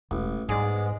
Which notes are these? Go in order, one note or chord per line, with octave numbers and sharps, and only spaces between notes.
E1 A1
G#2 G3 G#3 B3 G#4 D5